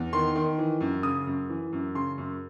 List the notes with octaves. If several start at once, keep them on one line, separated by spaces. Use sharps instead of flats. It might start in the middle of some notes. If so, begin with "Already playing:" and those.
Already playing: E2
D#3 C6
D#3
E3
F#2
C#3 D#6
F#2
E3
F#2
C#3 C6
F#2